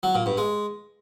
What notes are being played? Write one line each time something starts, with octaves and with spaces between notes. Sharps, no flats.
F#3
A#2
G2
G#3